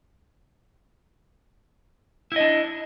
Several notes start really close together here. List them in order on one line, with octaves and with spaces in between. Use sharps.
E4 D#5 D4